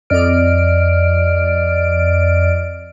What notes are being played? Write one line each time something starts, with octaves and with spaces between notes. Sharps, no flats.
F2 D5 D#5 F6 D7